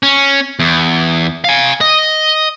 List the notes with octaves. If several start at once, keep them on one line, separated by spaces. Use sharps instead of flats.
C#4
E2
F5 G#5
D#5